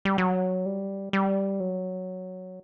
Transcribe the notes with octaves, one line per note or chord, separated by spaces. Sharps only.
G3
F#3
G3
G3
F#3